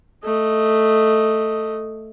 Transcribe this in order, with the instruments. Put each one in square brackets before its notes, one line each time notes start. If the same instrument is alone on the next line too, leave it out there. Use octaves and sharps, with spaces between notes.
[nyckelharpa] A3 D#5